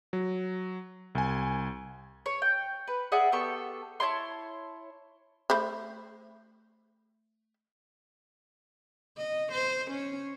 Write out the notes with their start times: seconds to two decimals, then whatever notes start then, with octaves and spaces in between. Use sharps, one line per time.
0.13 F#3
1.15 C2 G#5
2.26 C#5
2.42 G5
2.88 B4
3.12 G#4 D5 E5 F#5
3.32 B3 G4 A4 C#6
4.00 E4 C#5 A5 C6
5.50 A3 C5 B5
9.17 D#5
9.52 C5
9.91 C#4 C#5